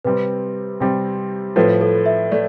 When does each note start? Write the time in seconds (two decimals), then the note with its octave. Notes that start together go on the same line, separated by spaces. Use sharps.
0.05 C3 G3 C4 B4
0.80 C3 G3 C4
1.56 A2 F3 A3 B4
1.81 A4
2.06 E5
2.32 A3 D5